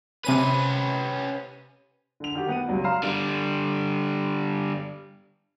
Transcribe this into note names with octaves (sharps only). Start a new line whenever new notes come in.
C3 C#4 B4 D#7
D3 F7
D#3 F#4 G4
B3 F#5 D#7
C#2 F#3 G3
F5 A#5 C6 F6 C7 E7
D3 G3